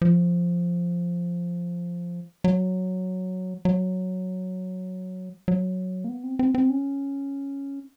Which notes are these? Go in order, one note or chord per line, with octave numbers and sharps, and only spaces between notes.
F3
F#3
F#3
F#3
A#3
B3
C4
C4
C4
C#4